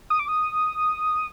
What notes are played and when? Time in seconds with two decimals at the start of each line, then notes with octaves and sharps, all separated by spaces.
0.10 D#6
0.19 D6
0.28 D#6